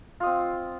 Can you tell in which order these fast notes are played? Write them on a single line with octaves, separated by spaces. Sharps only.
F4 D#5 C4